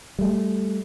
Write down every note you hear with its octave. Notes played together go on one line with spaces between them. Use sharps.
G3 A3